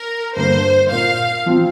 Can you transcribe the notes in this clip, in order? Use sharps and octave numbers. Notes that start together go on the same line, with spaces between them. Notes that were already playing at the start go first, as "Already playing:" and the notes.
Already playing: A#4
G2 D3 A#3 C5
A#2 A#3 F4 F5
F3 C4 F4